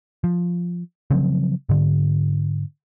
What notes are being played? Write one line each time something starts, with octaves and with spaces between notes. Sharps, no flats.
F3
C#3 F3 F#3 C4
G#2 D3